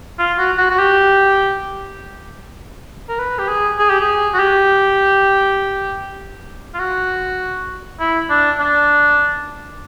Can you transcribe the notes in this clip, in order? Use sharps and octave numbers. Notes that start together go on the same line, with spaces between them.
F4
F#4
F#4
F#4
G4
A#4
B4
G4
G#4
G#4
G4
G#4
F#4
G4
F4
F#4
E4
D4
D4